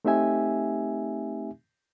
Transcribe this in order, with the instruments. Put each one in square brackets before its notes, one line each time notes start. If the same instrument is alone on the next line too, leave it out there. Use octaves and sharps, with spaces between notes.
[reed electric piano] A3 C4 D#4 G4 E5 G#5